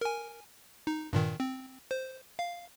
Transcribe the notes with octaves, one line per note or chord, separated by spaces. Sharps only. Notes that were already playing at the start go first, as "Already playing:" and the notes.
A#4 G#5
D#4
G2 A#2 D#3
C4
C5
F5